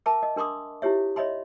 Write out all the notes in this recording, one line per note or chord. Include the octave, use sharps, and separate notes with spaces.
A#4 E5 A5 B5 D6
D#5
D4 A#4 C6 D6 D#6
E4 F4 G4 C#5 E5
C#5 D#5 E5 B5 C6